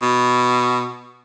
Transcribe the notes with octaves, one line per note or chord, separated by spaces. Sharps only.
B2